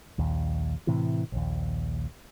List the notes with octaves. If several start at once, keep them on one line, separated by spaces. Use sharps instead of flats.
A#1 D#2
A2 C3 E3
A#1 D#2